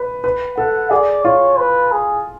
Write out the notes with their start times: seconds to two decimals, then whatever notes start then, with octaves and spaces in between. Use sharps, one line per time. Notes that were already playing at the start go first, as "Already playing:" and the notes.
Already playing: B4
0.24 B4
0.58 A4 F#5
0.90 G#4 D5
1.25 F4 C#5
1.58 B4
1.92 G#4